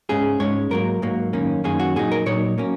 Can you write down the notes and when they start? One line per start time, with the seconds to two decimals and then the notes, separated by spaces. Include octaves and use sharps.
0.09 G#2 G#3 C#4 G#4
0.40 G#2 G#3 C#4 C#5
0.70 G#2 F#3 A#3 A#4
1.02 G#2 F#3 A#3
1.33 F#2 D#3 A#3 C#4
1.64 F#2 D#3 A#3 C#4 G#4
1.80 F#4
1.96 A#2 F#3 D#4 G#4
2.12 A#4
2.26 A#2 F#3 D#4 C#5
2.58 F#3 A#3 C#4